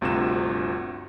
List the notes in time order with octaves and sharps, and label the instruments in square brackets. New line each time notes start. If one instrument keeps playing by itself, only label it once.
[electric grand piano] G1 D2 C3 F4 F#4 E7